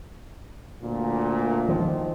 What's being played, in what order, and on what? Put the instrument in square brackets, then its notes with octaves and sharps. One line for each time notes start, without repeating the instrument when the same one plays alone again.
[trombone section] D2 A#2
[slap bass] D#3 F3